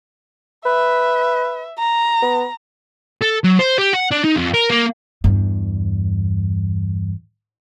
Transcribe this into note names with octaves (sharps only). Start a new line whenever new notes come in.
B4 E5
A#5
B3
A4
F#3
C5
G4
F#5
D4
D#4
F2
A#4
A#3
E2 G2